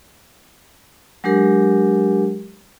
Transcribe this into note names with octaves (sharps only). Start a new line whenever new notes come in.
F#3 G#3 D4 G4 A#4